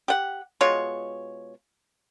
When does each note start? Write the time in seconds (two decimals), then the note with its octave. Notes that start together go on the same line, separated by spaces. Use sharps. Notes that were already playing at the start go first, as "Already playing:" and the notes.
0.08 G4 F#5
0.61 B2 G#3 F4 C#5